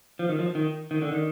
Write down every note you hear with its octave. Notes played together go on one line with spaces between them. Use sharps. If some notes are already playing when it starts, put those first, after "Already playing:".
F3
D#3
F3
D#3
D#3
D3
D#3